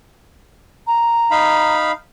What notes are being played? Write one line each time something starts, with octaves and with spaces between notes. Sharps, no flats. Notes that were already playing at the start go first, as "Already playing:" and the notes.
A#5
D#4 F5 B5